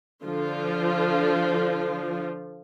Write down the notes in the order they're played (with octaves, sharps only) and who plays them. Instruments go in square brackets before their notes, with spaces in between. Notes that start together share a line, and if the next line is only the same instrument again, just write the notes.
[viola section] D3 F3 F4